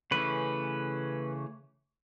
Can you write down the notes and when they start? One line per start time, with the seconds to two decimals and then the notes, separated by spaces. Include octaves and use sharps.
0.11 C#3 E3 A3 C#4 B4